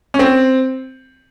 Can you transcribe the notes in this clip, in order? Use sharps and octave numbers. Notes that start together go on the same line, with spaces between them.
C#4
C4